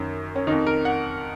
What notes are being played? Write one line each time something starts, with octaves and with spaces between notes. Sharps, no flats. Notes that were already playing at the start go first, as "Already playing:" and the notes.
Already playing: F#2 D#3 C#4
C#4
F2 D#3 D#4
A#4
F#5